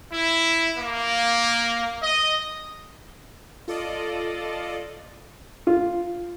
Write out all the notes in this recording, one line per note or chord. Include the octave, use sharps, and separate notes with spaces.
E4
A#3
D#5
F4 A4 D5 D#5
F4